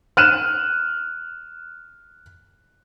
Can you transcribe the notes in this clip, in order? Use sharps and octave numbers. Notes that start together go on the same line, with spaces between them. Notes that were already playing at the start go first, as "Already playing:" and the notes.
F6 F#6 D#7 E7